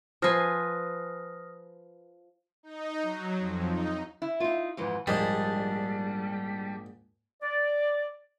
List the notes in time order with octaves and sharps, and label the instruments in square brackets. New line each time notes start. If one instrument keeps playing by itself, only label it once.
[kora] F3 B4 [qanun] C5 G#5 [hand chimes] D#6 F6 A#6
[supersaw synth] D#4
F#3
F2
D#4
[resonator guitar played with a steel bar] E4
[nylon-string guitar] D#4 F4
F2 G#2 E3
[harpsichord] A#1 G#2 D#5 [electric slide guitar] G3 D4
[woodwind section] D5